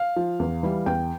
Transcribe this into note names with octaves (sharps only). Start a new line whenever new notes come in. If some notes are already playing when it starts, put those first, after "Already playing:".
Already playing: F5
F3
E2
E3 G3
E2 G5